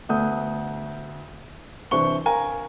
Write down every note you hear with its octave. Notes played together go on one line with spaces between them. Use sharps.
D2 A3 B3 F#5 D#6 G6
C2 E3 D4 C5 C#6 G7
A#4 F5 G#5 A#5